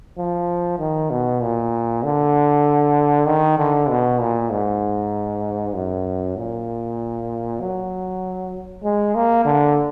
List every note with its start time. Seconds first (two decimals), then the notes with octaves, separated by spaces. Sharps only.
0.18 F3
0.79 D#3
1.10 B2
1.41 A#2
2.03 D3
3.27 D#3
3.58 D3
3.89 B2
4.20 A#2
4.50 G#2
5.75 F#2
6.37 A#2
7.60 F#3
8.84 G#3
9.15 A#3
9.45 D3